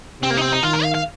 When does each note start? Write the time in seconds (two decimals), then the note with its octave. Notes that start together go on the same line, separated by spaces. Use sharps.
0.21 C3 C4
0.30 A#3
0.37 D#4
0.41 C4
0.52 D#4
0.63 D#3 F4
0.74 A#4
0.84 F5
0.95 F5